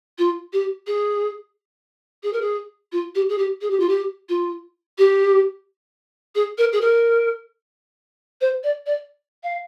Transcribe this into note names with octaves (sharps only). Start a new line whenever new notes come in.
F4
G4
G#4
G#4
A#4
G#4
F4
G4
G#4
G4
G#4
G4
F4
G4
F4
G4
G#4
A#4
G#4
A#4
C5
D5
D5
F5